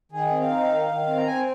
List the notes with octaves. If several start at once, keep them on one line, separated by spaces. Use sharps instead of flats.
D#3 G#4
C4
F5
D#4
D#3
D#3
C4
A#5
C4 G#5